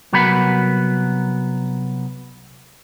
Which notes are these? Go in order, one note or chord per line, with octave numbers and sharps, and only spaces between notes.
C2 F#3 B3 A#4 F#5 B5